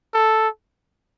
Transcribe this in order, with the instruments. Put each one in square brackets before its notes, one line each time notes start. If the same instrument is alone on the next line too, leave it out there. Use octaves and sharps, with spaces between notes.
[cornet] A4